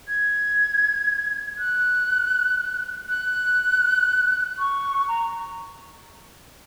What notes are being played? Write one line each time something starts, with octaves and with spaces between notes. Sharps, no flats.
G#6
F#6
F#6
C#6
A#5